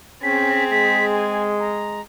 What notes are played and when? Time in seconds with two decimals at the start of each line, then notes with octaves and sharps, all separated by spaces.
0.23 C4 C#4 G#4 B6
0.71 G#3 B6
1.14 G#5
1.60 A#5